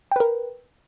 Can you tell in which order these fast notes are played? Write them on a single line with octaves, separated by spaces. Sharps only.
G5 B4 A#4